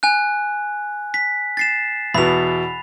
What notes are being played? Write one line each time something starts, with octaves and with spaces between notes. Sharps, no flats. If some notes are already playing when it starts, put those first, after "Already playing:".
G#5 F#6
B6
A6 C7 E7
E2 B2 B5 F7